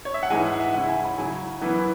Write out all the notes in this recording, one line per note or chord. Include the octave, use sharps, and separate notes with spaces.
C#5
E5
F#5
G#2 E3 G#3 G#5
F#5
E5
C#3 G#3 C#4 E4 F#5
G#5
B5
C#3 F#3 E4 G#5
F#2 E3 B3 E4